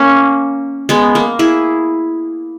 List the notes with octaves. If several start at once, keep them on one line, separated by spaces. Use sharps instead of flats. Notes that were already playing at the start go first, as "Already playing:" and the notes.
Already playing: A#3 C#4
G#3 B3
A#3
E4 G#4